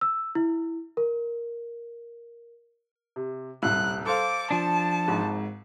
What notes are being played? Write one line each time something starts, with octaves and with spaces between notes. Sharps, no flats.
E6
E4
A#4
C3
D#1 C2 F#6
A4 C5 F5 D6
F3 D4 A5
G#1 G#2